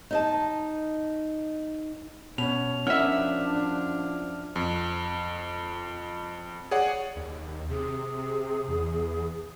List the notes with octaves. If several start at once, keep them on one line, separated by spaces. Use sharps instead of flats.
D#4 D#5 A5
B2 C#4 F7
F3 C#4 D4 E4 A#4 E5 F#5 F6
F2
G#4 C#5 D5 F#5
D#2
C3 G#4
E2